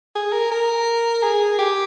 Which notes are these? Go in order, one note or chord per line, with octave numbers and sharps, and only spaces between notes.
G#4
A#4
A#4
G#4
G4